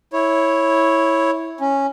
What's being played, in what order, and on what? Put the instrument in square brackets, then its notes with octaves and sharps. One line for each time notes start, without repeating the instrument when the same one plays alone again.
[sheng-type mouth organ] E4 C#5
C#4